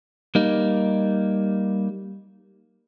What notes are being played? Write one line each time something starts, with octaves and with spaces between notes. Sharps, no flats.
G3 A#3 D#4